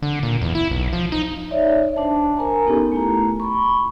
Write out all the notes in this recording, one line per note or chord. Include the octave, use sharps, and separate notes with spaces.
D3
A#2
E2
E4
B1
F3
D#4
D#4 C#5 D5 E5
D4 C5 A5
A#4 G#5 A#5
B3 C#4 D#4 G4 A4 A#4
A3 E4 A#5
B5 C#6